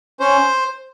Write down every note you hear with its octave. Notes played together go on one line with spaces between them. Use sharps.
C#4 C5